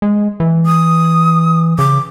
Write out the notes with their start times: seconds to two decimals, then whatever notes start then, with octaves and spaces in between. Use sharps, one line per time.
0.02 G#3
0.40 E3
0.66 D#6
1.78 C#3 D6